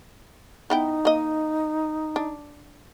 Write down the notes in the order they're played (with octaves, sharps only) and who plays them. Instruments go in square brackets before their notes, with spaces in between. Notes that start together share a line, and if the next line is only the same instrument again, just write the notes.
[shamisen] B3 E4 G5 [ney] D#4
[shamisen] A#3 D#5
D4